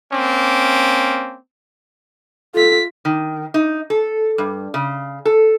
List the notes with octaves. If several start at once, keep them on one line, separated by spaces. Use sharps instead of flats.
A#3 C4 C#4 D6
F4 A4 B6
D#3
D#4
A4
G2
C#3
A4